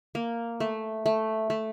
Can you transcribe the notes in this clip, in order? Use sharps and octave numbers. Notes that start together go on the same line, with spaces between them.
A#3
A3
A3
A3